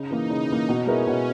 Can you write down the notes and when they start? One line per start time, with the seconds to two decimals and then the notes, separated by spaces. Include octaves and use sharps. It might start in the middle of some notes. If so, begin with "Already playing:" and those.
Already playing: C#3 D#4
0.11 E3 A#3
0.30 C#3
0.49 E3 A#3
0.68 B2 C#4
0.87 G#3 B3 E4 A#4
1.07 B2